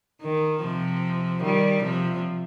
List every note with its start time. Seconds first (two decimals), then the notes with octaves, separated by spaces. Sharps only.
0.23 D#3
0.62 C3 F3
1.43 D#3 G3
1.83 C3 F3